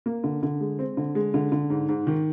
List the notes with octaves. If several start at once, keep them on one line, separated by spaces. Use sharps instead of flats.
A#3
D3
D3
G#3
C4
D3
G#3
D3
D3
G#2
G#2
D#3